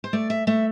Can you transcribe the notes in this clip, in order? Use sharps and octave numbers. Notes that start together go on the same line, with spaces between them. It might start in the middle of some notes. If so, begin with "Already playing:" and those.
C5
A3 D5
E5
A3 E5